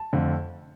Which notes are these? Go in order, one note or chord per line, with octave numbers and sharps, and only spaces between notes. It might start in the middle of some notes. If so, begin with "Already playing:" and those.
Already playing: A5
F2 D3 A3